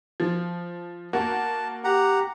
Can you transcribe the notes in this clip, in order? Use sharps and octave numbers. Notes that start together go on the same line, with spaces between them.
F3
A#3 F#4 A5
G4 F#5 A#5